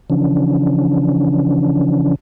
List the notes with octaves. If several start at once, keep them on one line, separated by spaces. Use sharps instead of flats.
C#3 E3 F3 C#4 D4